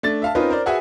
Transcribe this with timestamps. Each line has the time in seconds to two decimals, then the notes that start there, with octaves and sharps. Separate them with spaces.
0.03 A3 D4 A6
0.22 E5 F5 A5
0.35 C4 C#4 D#4 F4 A#4 B4
0.50 A#4 C5 D5
0.66 F#4 G#4 B4 E5 F#5 G#5